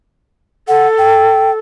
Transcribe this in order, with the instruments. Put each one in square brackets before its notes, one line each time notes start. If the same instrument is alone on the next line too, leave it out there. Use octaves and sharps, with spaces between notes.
[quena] A4 [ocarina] F#5
[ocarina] G5